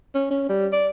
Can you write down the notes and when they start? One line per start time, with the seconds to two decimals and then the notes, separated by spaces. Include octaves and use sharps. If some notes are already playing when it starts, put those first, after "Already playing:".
0.15 C#4
0.31 C#4
0.49 G3
0.73 D5